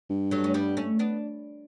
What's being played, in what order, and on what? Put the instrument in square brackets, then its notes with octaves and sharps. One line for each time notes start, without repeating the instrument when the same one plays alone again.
[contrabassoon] G2
[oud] F#3 A3
C#4
G3 B3
A3 C#4
B3 D4